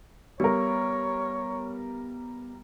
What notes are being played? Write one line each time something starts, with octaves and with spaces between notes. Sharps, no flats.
G3 B3 A#4 C#5